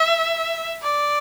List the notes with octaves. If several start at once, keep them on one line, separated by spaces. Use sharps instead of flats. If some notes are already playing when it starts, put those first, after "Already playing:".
Already playing: E5
D5